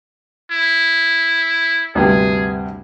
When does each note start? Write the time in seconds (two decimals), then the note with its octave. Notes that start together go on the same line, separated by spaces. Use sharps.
0.51 E4
1.95 D2 G2 C3 G#4